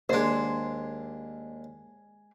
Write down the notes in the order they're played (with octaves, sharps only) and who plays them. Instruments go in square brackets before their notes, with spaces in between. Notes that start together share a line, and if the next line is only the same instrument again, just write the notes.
[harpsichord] D#2 D4 [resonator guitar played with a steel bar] G#3 C5